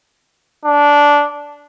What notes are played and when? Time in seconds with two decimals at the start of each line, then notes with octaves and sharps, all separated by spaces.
0.65 D4